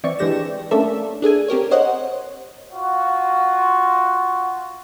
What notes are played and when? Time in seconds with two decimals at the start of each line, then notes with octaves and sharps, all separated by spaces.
0.04 E3 C4 D5 C#6
0.19 E3 G#3 D4 G4 A#6 E7
0.71 A3 A#3 C#4 D4 A4 E5
1.22 D4 G#4 A4 G#5
1.48 C4 G4 A#4 C#5
1.71 C5 C#5 D#5 F#5
2.73 F4 F#4